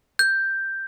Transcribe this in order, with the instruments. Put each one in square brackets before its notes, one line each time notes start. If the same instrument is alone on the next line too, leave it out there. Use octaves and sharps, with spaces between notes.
[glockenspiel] G6